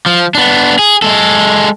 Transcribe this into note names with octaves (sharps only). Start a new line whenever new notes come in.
F3
B3 D4
G#4
G#3 A4